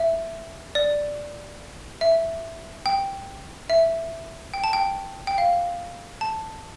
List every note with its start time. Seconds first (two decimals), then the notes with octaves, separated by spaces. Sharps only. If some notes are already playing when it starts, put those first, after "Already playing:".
Already playing: E5
0.75 D5
2.01 E5
2.86 G5
3.70 E5
4.54 G5
4.64 A5
4.73 G5
5.27 G5
5.38 F5
6.21 A5